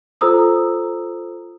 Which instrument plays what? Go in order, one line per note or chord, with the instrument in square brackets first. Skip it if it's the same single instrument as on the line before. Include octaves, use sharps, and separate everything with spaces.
[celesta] F4 A4 C5 A#5 D#6 E6